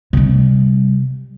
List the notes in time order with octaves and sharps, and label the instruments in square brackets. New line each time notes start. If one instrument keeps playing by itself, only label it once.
[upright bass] C3 G3